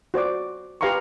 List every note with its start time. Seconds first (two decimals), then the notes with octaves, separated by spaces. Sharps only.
0.14 F#4 C5 D5 D6
0.81 G4 B4 F5 A#5 C6 C#6